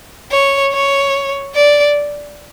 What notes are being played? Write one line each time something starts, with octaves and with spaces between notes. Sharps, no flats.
C#5
C#5
D5